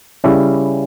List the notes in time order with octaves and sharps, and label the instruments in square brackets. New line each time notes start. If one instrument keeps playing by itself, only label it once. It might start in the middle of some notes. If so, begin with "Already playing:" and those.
[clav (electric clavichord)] C#3 G3 C#4 E4